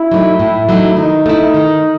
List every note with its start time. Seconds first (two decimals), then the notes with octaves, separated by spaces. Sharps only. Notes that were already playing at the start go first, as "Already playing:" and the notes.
Already playing: E4
0.12 F#3 A3 D#4
0.39 A2
0.69 F#3 A3 D#4
0.97 D#3 D#4
1.26 A3 E4
1.54 D#3